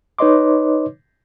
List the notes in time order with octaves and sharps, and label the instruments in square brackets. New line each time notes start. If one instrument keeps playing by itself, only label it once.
[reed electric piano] D#4 B4 C#5 D#5 C6 D6